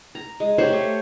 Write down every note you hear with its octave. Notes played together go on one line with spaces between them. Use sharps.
A#5
G#3
G4 C5 C#5 F#5
A3